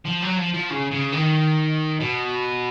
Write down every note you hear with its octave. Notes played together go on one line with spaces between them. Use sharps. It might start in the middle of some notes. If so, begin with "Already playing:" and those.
F3
F#3
F3
F3
C#3
C#3
D#3
B2